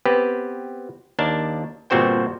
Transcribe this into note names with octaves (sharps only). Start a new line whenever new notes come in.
B3 C4 G4 B4
D#2 D4 A#4 A5
G1 A#2 C4 F#4 C5 G5